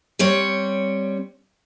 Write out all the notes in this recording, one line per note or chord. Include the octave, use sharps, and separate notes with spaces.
G3 C4 C#5